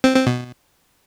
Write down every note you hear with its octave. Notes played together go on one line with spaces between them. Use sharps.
C4
C4
B2